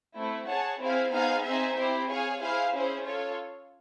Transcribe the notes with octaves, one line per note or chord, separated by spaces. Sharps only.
A3 C4 E4
G#4 C#5 F#5 A5
C4 E4 G#4 C5 F5
B3 D#4 G#4 C5 F5
C4 D#4 G#4 C5 E5
C4 E4 G4 C5
G#4 C#5 F5 G#5
E4 G#4 C5 F5
C#4 E4 G#4 C5
F4 A4 C#5